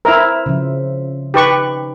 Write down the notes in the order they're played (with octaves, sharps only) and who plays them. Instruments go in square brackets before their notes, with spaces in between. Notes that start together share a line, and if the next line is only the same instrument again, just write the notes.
[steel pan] E4 A#4 [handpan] C5 E5
[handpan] C#3 F3
[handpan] D#4 [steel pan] G4 B4 C#6